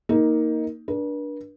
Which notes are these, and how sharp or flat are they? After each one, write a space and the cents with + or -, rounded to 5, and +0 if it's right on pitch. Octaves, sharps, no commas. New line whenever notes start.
A#3 +0 D#4 +15
D4 +0 B4 -45